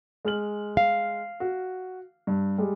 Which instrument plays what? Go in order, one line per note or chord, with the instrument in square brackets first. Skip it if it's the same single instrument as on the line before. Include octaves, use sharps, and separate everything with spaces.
[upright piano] G#3 F6 F#7
[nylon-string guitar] F5
[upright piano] F#4
G2
G3 G#3